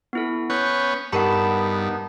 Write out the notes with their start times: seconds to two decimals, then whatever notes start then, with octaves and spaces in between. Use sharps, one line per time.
0.13 B3 E4 A4
0.50 B3 C#4 F#6 G6
1.12 G2 B3 D#4 G4 A#4 F#5 A5 B5